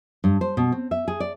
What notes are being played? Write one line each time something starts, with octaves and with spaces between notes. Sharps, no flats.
G2
C5
B2
C4
E5
G#4
D5